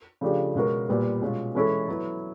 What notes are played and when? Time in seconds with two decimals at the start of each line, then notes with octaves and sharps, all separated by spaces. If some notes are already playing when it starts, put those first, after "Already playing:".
0.21 C#3 F3 A3 D4 G4
0.55 B2 G#3 C#4 F#4 A#4
0.89 A#2 G3 B3
1.21 B2 G#3 C#4 F4
1.55 E3 G#3 C#4 E4 A4
1.88 F#3 B3 E4